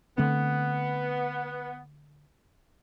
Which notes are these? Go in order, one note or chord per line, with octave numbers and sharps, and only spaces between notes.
D3 A3 B3 C4